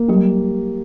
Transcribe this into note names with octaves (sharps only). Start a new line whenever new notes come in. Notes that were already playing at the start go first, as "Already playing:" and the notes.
Already playing: A#3
F#3 G3